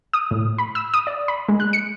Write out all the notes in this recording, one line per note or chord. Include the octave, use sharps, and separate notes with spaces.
D#6
A2
B5
E6
D#6
D5
B5
G#3
F#6
C#7